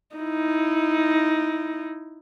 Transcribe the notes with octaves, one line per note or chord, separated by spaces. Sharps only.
D#4 E4